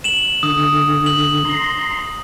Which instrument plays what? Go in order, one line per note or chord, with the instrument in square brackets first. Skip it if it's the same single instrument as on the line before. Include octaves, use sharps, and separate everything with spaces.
[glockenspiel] E7 F#7
[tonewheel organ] D3 [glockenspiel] D#6
[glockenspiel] F#7
[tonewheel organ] A#5 C6